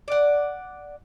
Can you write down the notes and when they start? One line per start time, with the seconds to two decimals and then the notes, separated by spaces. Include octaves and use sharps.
0.08 D5 F#5